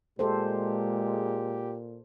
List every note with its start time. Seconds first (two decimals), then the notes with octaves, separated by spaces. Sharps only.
0.19 A#2 G#3 G4 A4 C5